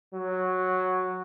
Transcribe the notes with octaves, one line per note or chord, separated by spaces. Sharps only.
F#3